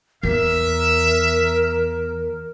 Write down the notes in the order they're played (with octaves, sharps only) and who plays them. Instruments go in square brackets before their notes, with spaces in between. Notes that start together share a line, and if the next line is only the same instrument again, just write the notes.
[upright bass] E2 [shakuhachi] A#4 [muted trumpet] E5